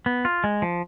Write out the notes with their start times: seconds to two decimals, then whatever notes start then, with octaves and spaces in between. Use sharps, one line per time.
0.06 B3
0.25 F4
0.44 G#3
0.62 F3